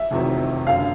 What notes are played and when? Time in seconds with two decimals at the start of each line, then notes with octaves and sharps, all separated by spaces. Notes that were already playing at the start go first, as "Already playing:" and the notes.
Already playing: E5
0.11 F1 E2 C3 D#3 F#3
0.66 F#1 F#2 D3 F5